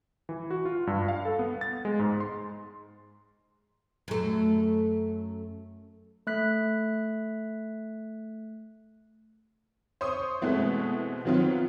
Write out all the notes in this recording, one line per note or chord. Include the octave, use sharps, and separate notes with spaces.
E3
F#4
F4
G2
F5
A4
B3
A6
G#3
G#2
C6
F#2 A3
A3 F#6 B6
C5 C#5 C6 D#6
B2 E3 G#3 A3 B3 C4
D#3 F#3 B3 C4 F4